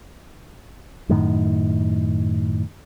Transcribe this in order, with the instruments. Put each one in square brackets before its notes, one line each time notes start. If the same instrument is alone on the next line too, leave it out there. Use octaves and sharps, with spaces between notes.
[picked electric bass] F#2 A2 D#3